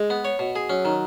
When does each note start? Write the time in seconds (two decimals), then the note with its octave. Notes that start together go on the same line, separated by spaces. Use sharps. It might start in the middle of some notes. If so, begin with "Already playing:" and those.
Already playing: G#3
0.10 B3
0.25 C#5
0.39 B2
0.56 G#4
0.70 F#3 C#4
0.85 D#3